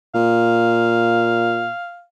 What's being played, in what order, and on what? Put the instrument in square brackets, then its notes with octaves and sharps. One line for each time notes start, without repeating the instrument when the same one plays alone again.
[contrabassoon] A#2 [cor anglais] F5